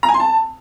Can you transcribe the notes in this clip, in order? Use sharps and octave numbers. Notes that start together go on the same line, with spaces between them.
A#5
G#5
C6
A5